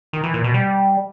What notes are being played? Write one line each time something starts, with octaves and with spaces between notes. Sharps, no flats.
D#3
E3
A#2
B2
G3